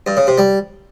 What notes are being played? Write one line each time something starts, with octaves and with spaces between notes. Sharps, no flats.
G2
C#3
C3
G3